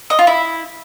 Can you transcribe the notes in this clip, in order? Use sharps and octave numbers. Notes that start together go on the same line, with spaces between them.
D#5
F4
E4